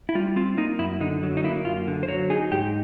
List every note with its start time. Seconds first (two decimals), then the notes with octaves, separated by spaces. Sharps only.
0.09 E4
0.15 G3 F4
0.36 C4 F4
0.57 A#3 D#4
0.79 F#2 E4
1.01 D3 D#4
1.23 F#3
1.37 D#4
1.44 A#3 E4
1.65 F#2 F4
1.88 D3
2.03 C5
2.08 F#3 C#5
2.30 D#4 G#4
2.52 G#2 G4